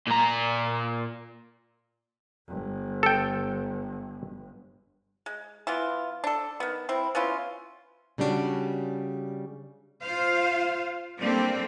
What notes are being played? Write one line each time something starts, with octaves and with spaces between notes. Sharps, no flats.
A#2 A#5
G1
A4 G5
G#3
E3 B3 F4
D4 A4
D#3 B3
C4 E4
B3 C#4 E4 F4
C#3 G3 C#4 D4 F#4
F4 C5 F5
G3 A#3 C4 D4 A4